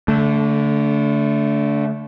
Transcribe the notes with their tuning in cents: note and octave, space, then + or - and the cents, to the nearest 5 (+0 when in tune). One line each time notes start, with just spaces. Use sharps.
D3 -25 A3 +0